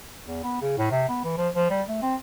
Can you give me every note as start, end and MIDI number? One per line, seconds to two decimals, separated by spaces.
0.27 0.42 40
0.43 0.61 59
0.62 0.74 49
0.78 0.87 45
0.91 1.04 48
1.09 1.20 59
1.25 1.33 52
1.38 1.49 53
1.54 1.68 53
1.70 1.82 55
1.89 1.97 57
2.02 2.15 60